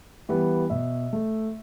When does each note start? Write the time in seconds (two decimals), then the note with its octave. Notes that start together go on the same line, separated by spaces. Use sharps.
0.29 E3 G3 B3
0.70 B2 E5
1.13 A3